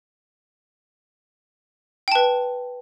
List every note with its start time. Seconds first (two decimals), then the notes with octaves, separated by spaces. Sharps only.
2.08 G5
2.12 A5
2.15 B4